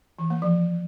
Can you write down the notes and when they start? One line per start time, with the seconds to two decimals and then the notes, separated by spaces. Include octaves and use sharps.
0.19 E3
0.30 A#3
0.42 F3